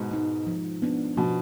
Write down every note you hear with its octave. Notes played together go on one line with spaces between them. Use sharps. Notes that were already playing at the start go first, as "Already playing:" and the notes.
Already playing: G#2 B2
G#3 D#4
F3
B3 D4
B2 F3